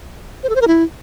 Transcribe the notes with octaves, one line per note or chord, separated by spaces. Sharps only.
C5
A4
C5
A#4
E4